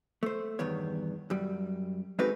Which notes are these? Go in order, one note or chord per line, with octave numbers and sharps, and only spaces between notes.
A3 C5
E2 G2 D#3 B3 C#5
F#2 G3
G#3 A3 C4 D#4 F#4 B4